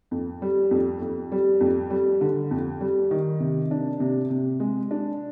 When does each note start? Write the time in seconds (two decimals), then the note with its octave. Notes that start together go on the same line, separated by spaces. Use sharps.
0.11 F2
0.42 G3
0.71 F2
1.02 F2
1.32 G3
1.60 F2
1.90 G3
2.21 D3
2.51 F2
2.81 G3
3.11 D#3
3.40 C3
3.71 D4
4.00 C3
4.30 C3
4.60 G#3
4.91 D4